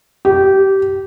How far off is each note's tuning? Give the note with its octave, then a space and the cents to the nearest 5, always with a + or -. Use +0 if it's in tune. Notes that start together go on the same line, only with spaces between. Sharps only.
G4 -20